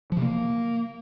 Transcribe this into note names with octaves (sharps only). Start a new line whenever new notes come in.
F3
C3
A#3